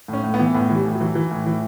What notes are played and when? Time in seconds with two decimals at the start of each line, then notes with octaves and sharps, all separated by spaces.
0.08 A2
0.13 C#4
0.24 A2
0.34 B3
0.39 E3
0.54 A2 B3
0.70 E3
0.75 G3
0.85 A2
0.95 F#3
1.00 E3
1.15 E3
1.31 A2
1.46 E3